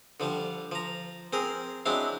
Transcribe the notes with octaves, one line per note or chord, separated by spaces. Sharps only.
D3 F3 G3
F3 A#5
C4 G#4 A#4
F#3 G#3 C4 D4 E4